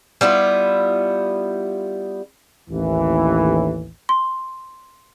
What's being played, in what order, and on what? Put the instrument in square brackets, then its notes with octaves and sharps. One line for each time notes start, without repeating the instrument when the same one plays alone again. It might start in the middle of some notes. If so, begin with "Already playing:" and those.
[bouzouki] G3 B3 E4 F4
[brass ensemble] A1 D#2 E3
[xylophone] C6